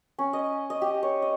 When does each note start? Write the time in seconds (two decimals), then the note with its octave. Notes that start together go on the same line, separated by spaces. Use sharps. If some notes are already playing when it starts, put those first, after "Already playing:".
0.19 C#4
0.33 D#5
0.70 D#5
0.82 G4
1.03 C#5
1.22 D#5